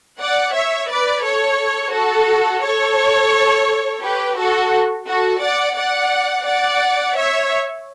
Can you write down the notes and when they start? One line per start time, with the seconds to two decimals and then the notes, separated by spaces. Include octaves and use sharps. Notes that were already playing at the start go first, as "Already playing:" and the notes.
0.20 D5 F#5
0.54 C#5 E5
0.89 B4 D5
1.24 A4 C#5
1.93 F#4 A4
2.64 A4 C#5
4.03 G4 B4
4.38 F#4 A4
5.07 F#4 A4
5.42 D5 F#5
5.76 D5 F#5
6.46 D5 F#5
7.17 C#5 E5